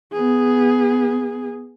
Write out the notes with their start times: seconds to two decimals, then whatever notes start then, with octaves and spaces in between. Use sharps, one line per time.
0.13 B3 G#4